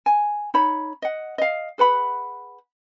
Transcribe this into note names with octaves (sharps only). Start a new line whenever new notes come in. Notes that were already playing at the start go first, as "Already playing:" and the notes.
G#5
D#4 C#5 B5
D#5 F#5
D#5 F5
G#4 B4 F#5 B5